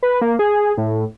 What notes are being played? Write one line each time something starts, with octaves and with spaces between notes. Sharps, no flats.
B4
A#3
G#4
A2